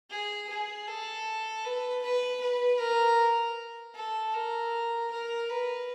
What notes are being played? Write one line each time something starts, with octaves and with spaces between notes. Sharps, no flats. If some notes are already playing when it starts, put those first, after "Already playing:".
G#4
G#4
A4
B4
B4
B4
A#4
A4
A#4
A#4
B4